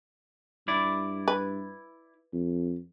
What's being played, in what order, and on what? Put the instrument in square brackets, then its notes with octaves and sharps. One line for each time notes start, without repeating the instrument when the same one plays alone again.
[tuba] G2 [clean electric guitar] E4 D5
[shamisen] B4
[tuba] F2